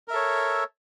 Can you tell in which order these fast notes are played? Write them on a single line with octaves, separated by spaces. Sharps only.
A#4 E5 A4 C#5